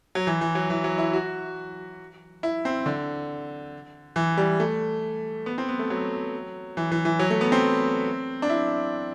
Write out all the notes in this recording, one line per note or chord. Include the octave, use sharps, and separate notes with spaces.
F#3
E3
E3
F#3
E3
F#3
E4
F#4
E4
C4
D3
E3
G3
A3
B3
C4
B3
A3
F#3
E3
E3
E3
F#3
A3
B3
C4
D4
E4